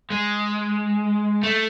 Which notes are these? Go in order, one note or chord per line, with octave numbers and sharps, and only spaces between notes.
G#3
A3